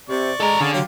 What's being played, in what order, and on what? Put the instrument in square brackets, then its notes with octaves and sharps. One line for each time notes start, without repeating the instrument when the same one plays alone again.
[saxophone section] C3 [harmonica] D5 C#6
[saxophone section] G#3 [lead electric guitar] A4 A#5
[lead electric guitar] D3 [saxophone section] C#4 G#4 F5
[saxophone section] F#3 [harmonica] F4 G4 F5